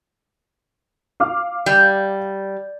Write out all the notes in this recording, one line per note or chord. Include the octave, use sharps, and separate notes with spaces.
F5 D6 F6
G3